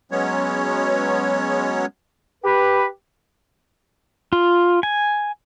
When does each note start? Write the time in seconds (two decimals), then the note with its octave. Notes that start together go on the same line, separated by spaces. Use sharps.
0.11 F#3 G#3 B3 C#4 C#5
2.43 G4 B4
4.33 F4
4.83 G#5